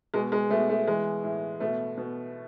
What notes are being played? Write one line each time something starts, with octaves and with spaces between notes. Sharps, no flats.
B2 G#3
G#3
B2 A3
A3
E3 G#3
A2
B2 A3
B2